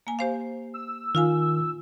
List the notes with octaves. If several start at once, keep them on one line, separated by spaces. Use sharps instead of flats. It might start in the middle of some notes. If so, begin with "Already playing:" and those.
A#3 G#5
G4 C5 F5
E6
D#3 F4 F5 G#5